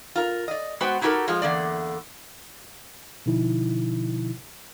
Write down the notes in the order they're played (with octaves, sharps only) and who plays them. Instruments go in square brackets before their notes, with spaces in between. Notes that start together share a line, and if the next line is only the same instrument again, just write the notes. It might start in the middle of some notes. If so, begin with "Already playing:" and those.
[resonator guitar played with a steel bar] F4 A#4
D5 D#5
G#3 B3 F#4 B4 C5 G5
D#4 E4 F#4 G4 A4 A#4
F3 G#3 F4
E2 D3 A#3 D5
[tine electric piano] B2 D3 F3 D#4 E4